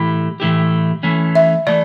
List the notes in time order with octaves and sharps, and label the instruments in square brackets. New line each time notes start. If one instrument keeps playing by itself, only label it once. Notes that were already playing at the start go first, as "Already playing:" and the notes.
Already playing: [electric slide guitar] A2 E3 A3 E4 G4
A2 E3 A3 E4 G4
E3 A3 C#4
[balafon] E5
[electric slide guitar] E3 A3 [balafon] D5